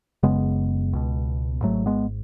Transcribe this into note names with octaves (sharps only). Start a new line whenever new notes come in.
F#1 F#2 C#3 G#3 B3
C#2 B2
G#1 G#2 F#3 A3
G#3 B3